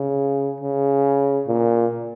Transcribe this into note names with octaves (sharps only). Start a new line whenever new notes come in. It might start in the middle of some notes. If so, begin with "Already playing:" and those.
Already playing: C#3
C#3
A#2